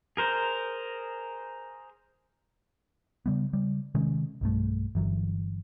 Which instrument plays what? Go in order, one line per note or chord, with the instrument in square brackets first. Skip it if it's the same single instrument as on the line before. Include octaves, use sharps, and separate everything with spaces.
[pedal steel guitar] G#4 A#4 C5
[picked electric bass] C#3 G3 B3
C#3 G3
C3 D#3 G#3 C#4
B1 G2 A3
G1 E3 F#3